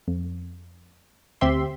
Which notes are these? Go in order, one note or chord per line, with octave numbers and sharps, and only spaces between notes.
F2
D2 C4 G4 E5 C6